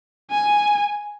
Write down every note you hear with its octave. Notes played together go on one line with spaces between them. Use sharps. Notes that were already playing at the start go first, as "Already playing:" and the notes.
G#5